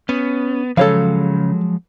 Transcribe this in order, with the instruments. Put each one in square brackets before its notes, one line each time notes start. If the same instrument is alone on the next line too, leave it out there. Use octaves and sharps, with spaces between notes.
[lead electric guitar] B3 [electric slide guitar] C#4
[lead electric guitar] C#3 [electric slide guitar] F3 F#3 G#3 [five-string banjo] A4 C#5 F5